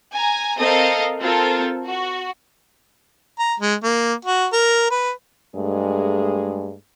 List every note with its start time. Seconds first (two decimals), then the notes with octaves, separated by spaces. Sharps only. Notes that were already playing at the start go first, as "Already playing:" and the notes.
0.12 G#5 A#5
0.57 C4 A4 A#4 D#5 F5
1.20 C4 F4 A4 A#4
1.84 F#4
3.39 A#5
3.60 G#3
3.83 A#3
4.25 F#4
4.53 A#4
4.91 B4
5.55 G2 G#3 A3 G#4